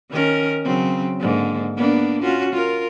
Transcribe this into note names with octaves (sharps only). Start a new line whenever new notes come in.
D#3 C#4 A#4
C#3 F#3 C4
G#2 D3 A#3
A#3 B3 D4
C#4 F4 F#4
F4 A#4